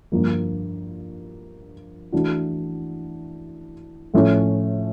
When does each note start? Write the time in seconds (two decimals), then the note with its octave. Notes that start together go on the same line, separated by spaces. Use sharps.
0.12 G2 D3 F3 A#3
2.12 E3 A3 D4 F#4
4.14 A2 F3 A3 C#4